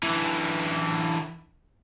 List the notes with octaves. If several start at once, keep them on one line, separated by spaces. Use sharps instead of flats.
D3 E3